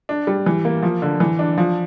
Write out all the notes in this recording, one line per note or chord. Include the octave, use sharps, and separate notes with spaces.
D4
G3
E3
A#3
F3
D3
E3
D4
F3